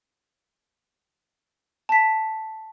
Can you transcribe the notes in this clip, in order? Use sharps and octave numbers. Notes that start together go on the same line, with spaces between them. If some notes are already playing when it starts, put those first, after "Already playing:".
A5 B6